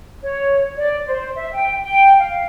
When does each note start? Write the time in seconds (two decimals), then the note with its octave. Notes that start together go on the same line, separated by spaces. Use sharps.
0.23 C#5
0.77 D5
1.07 C5
1.37 E5
1.53 G5
1.83 G5
2.20 F5